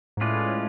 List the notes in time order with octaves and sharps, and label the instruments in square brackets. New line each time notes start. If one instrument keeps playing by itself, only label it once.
[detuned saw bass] G#2
[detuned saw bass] A2 [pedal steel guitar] G#3 C#4 F4 B4 D5